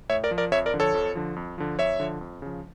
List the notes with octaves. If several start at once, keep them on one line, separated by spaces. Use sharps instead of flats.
A2 C#5 E5
A#4 D5
F3
A#4 D5
F2 C#5 E5
A#4 D5
D3 F3
A4 C#5
F2
D3 F3
F2
D3 F3
F2 C#5 E5
D3 F3
F2
C#3 F3